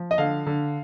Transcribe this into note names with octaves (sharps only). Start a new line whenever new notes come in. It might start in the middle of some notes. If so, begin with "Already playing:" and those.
Already playing: F3
D#5
D3 F5
D3